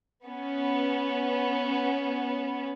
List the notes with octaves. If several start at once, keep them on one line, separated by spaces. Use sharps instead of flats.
B3 C#4